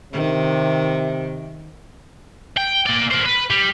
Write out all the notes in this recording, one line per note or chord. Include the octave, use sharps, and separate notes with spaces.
C3 D#3
G5
A#3 D5
A#4 C5
B4
G3